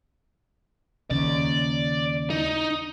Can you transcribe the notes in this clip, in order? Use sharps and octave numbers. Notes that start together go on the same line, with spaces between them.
D#2 C#3 D5
D#4